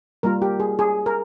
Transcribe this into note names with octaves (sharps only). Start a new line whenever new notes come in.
G3 A#3 F4 A#4
G4
G#4
G#4
A#4